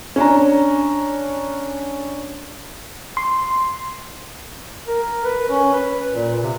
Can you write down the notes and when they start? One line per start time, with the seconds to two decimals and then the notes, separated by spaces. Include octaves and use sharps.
0.16 C#4 D4 A#5
3.17 C6
4.88 A#4
5.25 B4
5.50 C#4
5.73 B4
6.13 A#2
6.43 C3